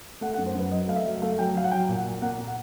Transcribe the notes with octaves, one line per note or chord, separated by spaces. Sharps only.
A3 F#5
F#5
F#2
C5
F#2 B4
F#3 D#5
A3 F5
E5
F#3
A3 F5
F#3 G5
F#3 F5
F#5
F#3 G5
A#2
F#5
A#2
A#3 F#5
A#3
F#5